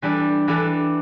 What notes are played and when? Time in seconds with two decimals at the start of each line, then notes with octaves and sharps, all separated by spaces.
0.02 E3 G3 D4 A4
0.48 E3 G3 D4 A4